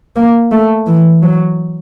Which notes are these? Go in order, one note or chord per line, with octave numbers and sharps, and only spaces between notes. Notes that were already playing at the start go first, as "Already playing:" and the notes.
A#3
A3
E3
F#3